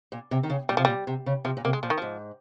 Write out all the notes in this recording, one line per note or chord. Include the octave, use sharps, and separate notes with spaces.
A#2
C3
D#3
C#3
A#2 G3
C3 F3
A#2 G3
C3
C#3
C3 F3
A#2
C3 A#3
G#3
A#2 F3
D#3
G#2 F3